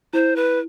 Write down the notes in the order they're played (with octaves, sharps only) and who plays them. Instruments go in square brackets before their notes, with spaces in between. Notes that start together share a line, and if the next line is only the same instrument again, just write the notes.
[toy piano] E4 [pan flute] C5
[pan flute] B4